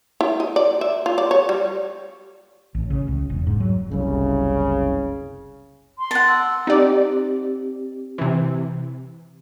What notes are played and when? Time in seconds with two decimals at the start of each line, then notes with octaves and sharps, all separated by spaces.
0.21 E4
0.40 D#5
0.56 D5
0.81 E5
1.06 F4
1.18 D5
1.31 C#5
1.49 G3
2.75 A1
2.90 C#3
3.08 C#2
3.30 E1
3.47 G#2
3.60 F#3
3.91 F#1 C2 C#3
5.98 C6
6.11 F#5 A5
6.28 E6
6.67 C4 D#4 G4 D5
8.18 C3 E3